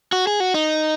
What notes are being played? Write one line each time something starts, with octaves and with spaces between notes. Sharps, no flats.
F#4
G#4
F#4
D#4